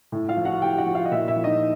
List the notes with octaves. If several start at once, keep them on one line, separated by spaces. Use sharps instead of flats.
A2
F4 F5
F3
F#4 F#5
A2 G4 G5
F#4 F#5
F3
F4 F5
D#5
A#2 E4 E5
E4 E5
F3
D#4 D#5